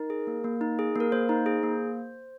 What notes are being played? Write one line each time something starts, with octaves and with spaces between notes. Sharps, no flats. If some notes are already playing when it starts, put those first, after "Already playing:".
Already playing: D#4 A#4
G#4
A#3
A#3
D#4
G#4
A#3 A#4
A#3 C5
D#4
G#4
A#3